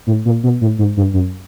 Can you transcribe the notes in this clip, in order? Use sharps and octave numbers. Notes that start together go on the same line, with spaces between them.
A2
A#2
B2
A2
G#2
G2
F#2